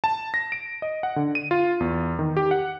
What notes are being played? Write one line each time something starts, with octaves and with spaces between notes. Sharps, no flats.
A5
A#6
D7
D#5
F#5
D3
D#7
F4
E2
D#3
G4
F#5